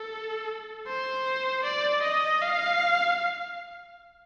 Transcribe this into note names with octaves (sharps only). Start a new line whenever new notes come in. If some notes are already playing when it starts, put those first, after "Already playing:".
Already playing: A4
C5
D5
D#5
F5